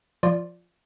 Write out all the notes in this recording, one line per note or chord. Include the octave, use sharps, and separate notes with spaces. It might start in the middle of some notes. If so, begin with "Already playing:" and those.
F3 F4 D5